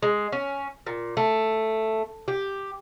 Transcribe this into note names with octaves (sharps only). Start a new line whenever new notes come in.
G#3
C#4
A#2
A3
G4